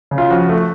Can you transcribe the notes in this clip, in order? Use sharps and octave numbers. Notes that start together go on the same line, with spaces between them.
C#3
F4
F3 F#4
A3